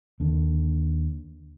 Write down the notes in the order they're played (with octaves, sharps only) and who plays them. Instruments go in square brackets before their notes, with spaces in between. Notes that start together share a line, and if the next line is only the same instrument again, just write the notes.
[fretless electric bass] D#2 D3